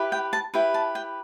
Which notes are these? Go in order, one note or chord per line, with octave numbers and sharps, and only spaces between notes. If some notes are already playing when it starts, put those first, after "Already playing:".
Already playing: E4 G4 B4
G5
A5
E4 G4 B4 G5
A5
G5